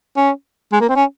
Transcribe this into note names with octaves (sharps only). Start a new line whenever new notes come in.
C#4
G#3
A#3
C4
C#4